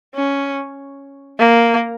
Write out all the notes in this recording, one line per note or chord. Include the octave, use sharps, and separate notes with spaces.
C#4
A#3